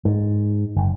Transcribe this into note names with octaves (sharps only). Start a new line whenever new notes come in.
G#2
F#1